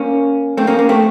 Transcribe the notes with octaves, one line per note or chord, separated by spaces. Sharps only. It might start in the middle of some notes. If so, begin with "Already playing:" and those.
Already playing: A#3 C#4
A3 C4
A#3 C#4
A#3
A3 C4